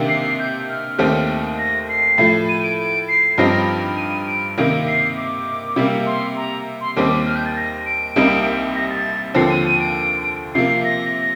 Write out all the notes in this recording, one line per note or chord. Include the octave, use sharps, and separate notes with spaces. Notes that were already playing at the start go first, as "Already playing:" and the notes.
Already playing: C3 D#3 A#3 D4 G4
C7
G6
F6
D#2 D#3 A3 C4 G4
A#6
C7
A2 F3 A3
D#7
D7
D7
C7
G2 F3 C4 D#4 G4 A#6
A#6
D#7
D7
C3 D#3 A#3 D7
C7
D6
C3 G3 A#3
C6
A#5
C6
D#2 D#3 G3 C4 D6
F6
G6
A6
A#6
D7
C2 C3 G3 A#3 D#4
A#6
A6
D#2 D3 F3 C4 C7
D#7
D#7
D7
C3 F3 A#3 C7
A#6
A#6